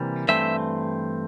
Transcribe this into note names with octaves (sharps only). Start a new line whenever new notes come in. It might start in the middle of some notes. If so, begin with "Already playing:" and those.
Already playing: C3 E3 G3 A#3
G2 E3 A3 C4 E5